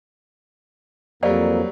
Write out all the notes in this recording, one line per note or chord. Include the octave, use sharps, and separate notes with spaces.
F2 F#3 G3 A#3 C5 D5 F5